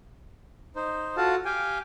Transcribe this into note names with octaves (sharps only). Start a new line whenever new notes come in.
D#4 C5
F4 F#4 A4 F5 F#5 A5
G4 F5 G5 G#5